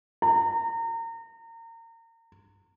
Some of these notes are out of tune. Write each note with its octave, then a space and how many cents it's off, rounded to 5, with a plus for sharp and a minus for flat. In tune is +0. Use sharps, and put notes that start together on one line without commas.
A#5 -30